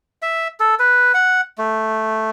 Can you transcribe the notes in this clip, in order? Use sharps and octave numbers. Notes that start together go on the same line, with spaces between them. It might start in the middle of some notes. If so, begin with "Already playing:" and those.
E5
A4
B4
F#5
A3